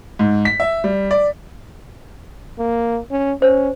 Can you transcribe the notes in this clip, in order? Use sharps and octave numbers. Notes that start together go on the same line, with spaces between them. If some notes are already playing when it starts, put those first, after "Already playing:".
G#2
B6
E5
G3
D5
A#3
C#4
C#4 C5